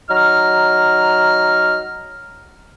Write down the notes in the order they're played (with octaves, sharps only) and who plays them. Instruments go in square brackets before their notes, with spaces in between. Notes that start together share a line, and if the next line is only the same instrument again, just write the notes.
[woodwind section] F#3 D#4 A#5 F6